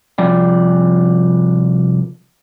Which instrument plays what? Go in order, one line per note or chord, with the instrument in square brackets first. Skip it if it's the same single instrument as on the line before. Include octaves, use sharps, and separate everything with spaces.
[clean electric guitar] C2 F3 D5 G5